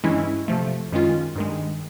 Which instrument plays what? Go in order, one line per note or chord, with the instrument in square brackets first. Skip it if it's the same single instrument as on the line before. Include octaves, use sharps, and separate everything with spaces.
[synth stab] G2 E3 G#3 C#4 E4
C3 F3 A3
F#2 D#3 G#3 C#4 F4
G2 D#3 G#3